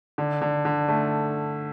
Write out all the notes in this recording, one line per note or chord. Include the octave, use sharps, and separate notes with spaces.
D3
D3
D3
A3